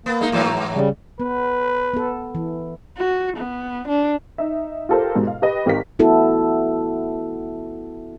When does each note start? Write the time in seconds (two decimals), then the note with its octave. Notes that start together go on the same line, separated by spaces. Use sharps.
0.06 A#3 B3
0.21 G#3 D#4
0.32 G#2 E3 F#3
0.74 C#3 G3
1.20 B3 B4
1.94 B3 A4
2.35 E3
2.97 F#4
3.37 B3
3.88 D4
4.38 D#4 E5
4.89 F4 G4 A4 A#4 C5
5.15 G#2 B2
5.27 F5
5.42 G4 B4 D#5
5.66 G#1 G4 A#4 F5 B6
5.99 B3 E4 F#4 A4